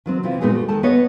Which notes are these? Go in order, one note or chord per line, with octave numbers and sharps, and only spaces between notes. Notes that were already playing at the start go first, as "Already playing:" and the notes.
D#3 F#3 C4
C3 E3 C4 F4
A#2 G#3 B3 D#4 F#4 G#4
G3 A3
D#3 G#3 A4 A5
B3 B4 C#5 D#5 F#5